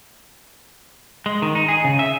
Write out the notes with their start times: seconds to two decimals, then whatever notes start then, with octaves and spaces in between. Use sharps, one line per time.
1.26 G#3
1.42 D#3
1.55 D#4
1.69 G#4
1.84 C#3
1.99 E5